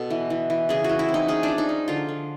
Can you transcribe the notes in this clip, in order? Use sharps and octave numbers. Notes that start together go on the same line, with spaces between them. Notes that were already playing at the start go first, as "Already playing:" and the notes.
Already playing: B2 B3 A4
E3
E3
E3
C#3 G#4
E3 F#4
E4
C4
D#4
C#4 G#4
D4
F3
D#4
C#4
D3 F4
D3